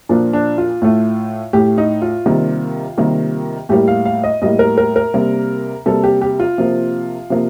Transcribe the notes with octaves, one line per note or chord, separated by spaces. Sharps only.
A#2 F3 A#3 D4
D4
F4
A2 A3
A2 A3 G4
D#4
F4
C3 D#3 G3 A#3
C3 D#3 G3 A#3
A2 G3 A#3 G4
F5
F5
D#5
A2 G3 A#3 D#5
A#4
A#4
A#4
C3 G3 A#3
C3 G3 A#3 A4
G4
G4
F4
C3 F3 A#3
C3 F3 A#3